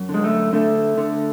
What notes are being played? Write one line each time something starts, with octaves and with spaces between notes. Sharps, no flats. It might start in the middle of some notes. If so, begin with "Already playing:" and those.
Already playing: F#2
D3
G#3
A3
D3 A3
D3